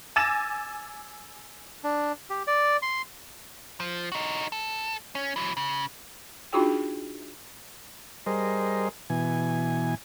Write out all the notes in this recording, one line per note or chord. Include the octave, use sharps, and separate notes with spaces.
G#5 D6 E6 A6 A#6 E7
D4
G4
D5
C6
F3
D#4 F#4
A4
C#4
E3 F#3
C#3
D4 D#4 F4 F#4 G#4 G5
G3 G#4 A#4 C5 D#5
B2 E3 G#5